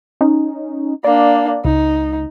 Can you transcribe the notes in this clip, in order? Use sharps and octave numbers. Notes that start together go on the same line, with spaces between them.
C#4 D#4
A#3 D4 D5
C#2 D#4